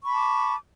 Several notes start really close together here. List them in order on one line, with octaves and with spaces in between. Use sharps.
C#6 B5 A5 D6